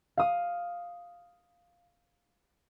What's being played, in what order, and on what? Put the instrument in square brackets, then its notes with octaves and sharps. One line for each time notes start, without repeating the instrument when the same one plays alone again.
[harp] F5 D#6